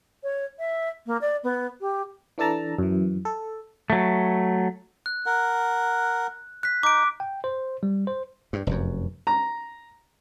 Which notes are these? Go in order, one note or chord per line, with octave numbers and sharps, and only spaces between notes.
C#5
E5
A#3
D5
B3
G4
E3 D4 A4 A5 A#5
F#2 E3
A4
F#3 A3
F#6
A#4 F#5
F#6 B6
D#4 D6 D7
G5
C5
G3
C5
G2
F1 F#2
A#5